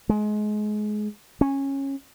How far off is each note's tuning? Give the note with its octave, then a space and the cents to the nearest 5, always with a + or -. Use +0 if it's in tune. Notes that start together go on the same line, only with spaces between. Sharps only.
G#3 +25
C#4 -15